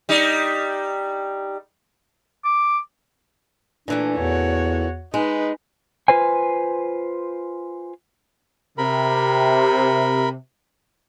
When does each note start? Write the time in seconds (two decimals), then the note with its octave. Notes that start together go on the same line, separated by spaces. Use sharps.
0.09 G3 D#4
2.44 D6
3.88 A#2 E3 A3 D4
4.17 E2 F#4 C#5
5.14 G#3 D#4 B4
6.08 F4 B4 C5 G#5
8.78 C3 A#4 B5